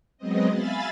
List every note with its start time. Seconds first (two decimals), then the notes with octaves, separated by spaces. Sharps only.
0.18 F#3 G#3 B3 C4 D#5
0.50 E5 F5 G#5 B5 A6